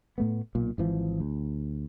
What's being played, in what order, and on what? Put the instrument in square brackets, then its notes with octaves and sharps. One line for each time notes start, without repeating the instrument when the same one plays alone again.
[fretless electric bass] A2 A3 B3
B1 A#2
G#1 E3 F3
D2